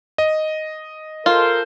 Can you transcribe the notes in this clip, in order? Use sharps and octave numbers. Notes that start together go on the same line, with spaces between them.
D#5
F4 A4 A#4 C5